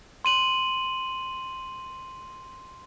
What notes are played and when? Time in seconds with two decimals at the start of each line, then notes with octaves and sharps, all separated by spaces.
0.25 C6 D#7 F#7